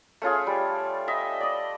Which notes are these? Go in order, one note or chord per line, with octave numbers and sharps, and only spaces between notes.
A3 C#4 F4 G#4
G3
D#5 E5
D5 D#5